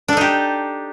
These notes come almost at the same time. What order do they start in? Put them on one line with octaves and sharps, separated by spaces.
D4 A4 D#4 G4